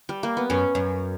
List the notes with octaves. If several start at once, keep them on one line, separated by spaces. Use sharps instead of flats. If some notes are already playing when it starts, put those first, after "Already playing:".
G3
A#3
B3
F#2 C#4
F#2